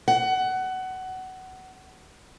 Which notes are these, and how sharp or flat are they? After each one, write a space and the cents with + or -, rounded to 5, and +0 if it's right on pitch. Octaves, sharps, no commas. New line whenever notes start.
F#5 +20